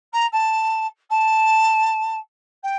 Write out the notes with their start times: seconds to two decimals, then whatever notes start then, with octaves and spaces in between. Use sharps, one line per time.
0.12 A#5
0.32 A5
1.10 A5
2.63 G5